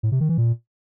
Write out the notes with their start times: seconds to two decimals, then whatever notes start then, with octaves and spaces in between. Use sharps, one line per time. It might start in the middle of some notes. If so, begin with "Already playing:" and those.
0.03 A2
0.12 C3
0.20 D#3
0.29 E3
0.38 A#2